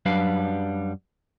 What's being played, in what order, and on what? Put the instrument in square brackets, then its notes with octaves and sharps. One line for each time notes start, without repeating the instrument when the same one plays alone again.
[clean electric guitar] F#2 F#3 G3 D4 B4 F5